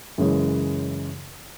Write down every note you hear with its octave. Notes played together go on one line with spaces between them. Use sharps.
F#2 C#3 E3 G#3